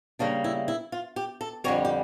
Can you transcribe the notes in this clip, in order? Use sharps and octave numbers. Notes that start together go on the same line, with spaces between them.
C#3 G3 A#3 D4
E4
E4
F4
G4
A4
F2 D3 G3 C#5
G4